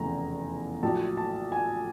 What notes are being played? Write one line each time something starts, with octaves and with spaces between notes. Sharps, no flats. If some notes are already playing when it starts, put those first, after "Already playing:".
Already playing: F1 E2 C#3 A#5
A#1 A2 F#3 A5
A5
G#5